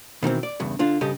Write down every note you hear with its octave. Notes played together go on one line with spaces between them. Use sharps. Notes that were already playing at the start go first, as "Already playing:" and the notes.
B2 D#3 E3 C4
D5
E2 G2 C#3
D3 D4 F4
G2 C#3 G4 A4 D#5